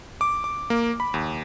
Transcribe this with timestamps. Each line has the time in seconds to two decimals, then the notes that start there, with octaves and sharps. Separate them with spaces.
0.21 D6
0.44 D6
0.70 A#3
1.00 B5
1.14 D#2